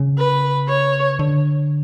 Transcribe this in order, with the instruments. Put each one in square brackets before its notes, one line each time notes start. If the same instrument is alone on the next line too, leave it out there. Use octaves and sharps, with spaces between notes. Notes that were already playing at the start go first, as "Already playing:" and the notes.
Already playing: [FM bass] C#3
[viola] B4
C#5
[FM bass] D3